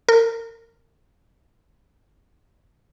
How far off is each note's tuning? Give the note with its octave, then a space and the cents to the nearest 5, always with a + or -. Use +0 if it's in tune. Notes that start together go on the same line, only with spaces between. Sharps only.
A#4 -30